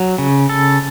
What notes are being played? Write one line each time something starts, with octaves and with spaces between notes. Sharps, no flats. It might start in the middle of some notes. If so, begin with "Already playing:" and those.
Already playing: F#3
C#3
A4